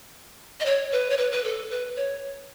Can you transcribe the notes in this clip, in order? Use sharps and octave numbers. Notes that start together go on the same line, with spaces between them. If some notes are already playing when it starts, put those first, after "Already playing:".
D#5
C#5
B4
C#5
B4
B4
A4
B4
C#5